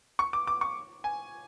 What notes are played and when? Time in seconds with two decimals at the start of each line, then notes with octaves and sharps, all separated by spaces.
0.19 C#6
0.33 D6
0.47 D6
0.61 C#6
1.04 G#5